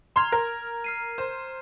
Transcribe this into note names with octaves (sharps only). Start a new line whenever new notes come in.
A#5 C6 F6 G#6 F7
A#4
F6 C7 D#7
C5